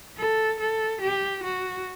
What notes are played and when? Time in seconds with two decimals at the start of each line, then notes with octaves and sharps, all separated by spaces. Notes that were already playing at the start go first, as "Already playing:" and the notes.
0.18 A4
0.60 A4
1.01 G4
1.43 F#4